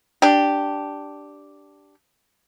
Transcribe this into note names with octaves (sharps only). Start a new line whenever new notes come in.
D4 G4